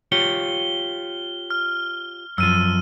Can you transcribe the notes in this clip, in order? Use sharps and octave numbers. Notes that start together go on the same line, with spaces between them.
F4 G4 C#5 G7
F6
F#2 F3 E6 F6 D#7